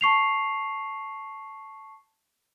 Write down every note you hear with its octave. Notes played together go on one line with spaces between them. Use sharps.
A5 C#6 C7 F7